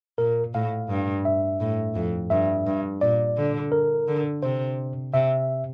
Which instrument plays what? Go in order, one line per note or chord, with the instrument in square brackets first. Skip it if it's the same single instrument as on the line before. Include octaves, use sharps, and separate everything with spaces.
[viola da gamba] A#2 [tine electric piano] A#4
[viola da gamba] A2 [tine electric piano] F5
[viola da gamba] G2
[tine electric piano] E5
[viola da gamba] A2
F2
[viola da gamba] G2 [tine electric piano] E5
[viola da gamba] G2
[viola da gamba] A#2 [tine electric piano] D5
[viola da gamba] D3
[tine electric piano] A#4
[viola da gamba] D3
[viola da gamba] C3 [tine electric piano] C5
[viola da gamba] C3 [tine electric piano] E5